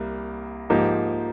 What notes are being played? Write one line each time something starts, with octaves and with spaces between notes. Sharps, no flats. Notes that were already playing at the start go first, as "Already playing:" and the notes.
Already playing: C2 G3 A#3
G#2 F3 A#3 D#4 G4